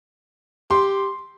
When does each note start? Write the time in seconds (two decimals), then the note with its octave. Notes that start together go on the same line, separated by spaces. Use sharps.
0.71 G4 C6